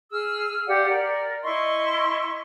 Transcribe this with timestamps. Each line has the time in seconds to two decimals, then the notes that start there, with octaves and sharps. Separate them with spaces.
0.12 G#4 E6 F6
0.67 G4 D5 F5 F#5
0.89 A#4 D5
1.43 E4 D#5 C6 C#6